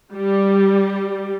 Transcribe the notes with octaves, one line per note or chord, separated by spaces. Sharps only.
G3